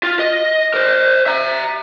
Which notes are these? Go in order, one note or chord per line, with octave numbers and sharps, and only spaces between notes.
F4
D#5
A#4 C5
E5 A#5